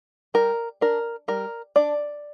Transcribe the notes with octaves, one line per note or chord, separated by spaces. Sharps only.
G3 A#4
D4 A#4
G3 A#4
D4 D5